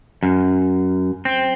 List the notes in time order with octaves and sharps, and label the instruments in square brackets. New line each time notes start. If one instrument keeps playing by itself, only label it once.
[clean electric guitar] F#2
C4